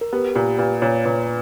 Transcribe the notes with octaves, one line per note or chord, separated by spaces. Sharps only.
A#4
B3 G4
A#2 G4
A#2 B4
A#2 C#5
A#2 B4